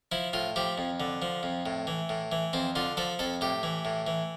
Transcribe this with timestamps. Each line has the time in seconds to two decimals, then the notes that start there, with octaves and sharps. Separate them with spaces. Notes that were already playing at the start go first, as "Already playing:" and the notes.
0.12 F3 E4
0.33 A2 F4
0.56 F3 G4
0.78 F2
1.00 D3
1.22 F3
1.43 F2
1.66 A2
1.87 E3
2.09 A2
2.32 E3
2.53 F2 C4
2.75 D3 F4
2.97 F3 A4
3.19 F2 A4
3.41 A2 G4
3.63 E3
3.85 A2
4.07 E3